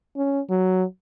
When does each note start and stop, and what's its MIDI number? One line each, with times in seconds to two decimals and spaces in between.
0.16 0.41 61
0.50 0.83 54